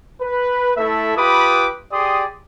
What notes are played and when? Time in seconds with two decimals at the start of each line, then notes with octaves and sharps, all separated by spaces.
0.21 B4
0.76 A3 E4 A4 E5
1.17 F4 G4 B4 B5 D6 D#6
1.92 G4 G#4 D5 C6 D#6